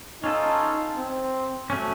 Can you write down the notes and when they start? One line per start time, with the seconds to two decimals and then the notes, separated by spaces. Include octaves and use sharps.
0.23 C#4 D#4 F4 A4
0.97 C4
1.70 F#3 A3 C#4